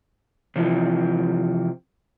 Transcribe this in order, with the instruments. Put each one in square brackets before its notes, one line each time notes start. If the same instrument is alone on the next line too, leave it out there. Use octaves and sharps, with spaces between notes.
[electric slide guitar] C3 E3 F3 C4